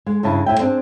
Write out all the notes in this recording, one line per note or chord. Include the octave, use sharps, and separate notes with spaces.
G#3
G2 C#3 E4 A5
A2 E5 G5
C4 D4 G#4